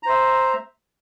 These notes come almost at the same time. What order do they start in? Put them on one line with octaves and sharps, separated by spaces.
A#5 C5 E5